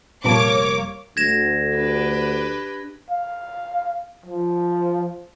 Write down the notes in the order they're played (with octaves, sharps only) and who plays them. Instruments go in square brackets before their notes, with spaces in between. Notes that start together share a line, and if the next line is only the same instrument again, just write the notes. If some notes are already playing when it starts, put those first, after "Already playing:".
[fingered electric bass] F1 G3 [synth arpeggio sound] A#2 B3 A5 [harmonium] A#3 [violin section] C#5 D6
[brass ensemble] D2 [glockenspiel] G#6 A#6 E7
[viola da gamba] D4 G4 B4
[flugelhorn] F5
F3